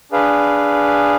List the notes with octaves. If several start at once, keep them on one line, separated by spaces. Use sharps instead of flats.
D4 G#4 B4 F5